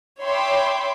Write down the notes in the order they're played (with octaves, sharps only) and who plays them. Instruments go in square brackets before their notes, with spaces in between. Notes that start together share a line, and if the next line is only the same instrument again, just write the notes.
[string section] C#5 E5 G5 B5 C6 D6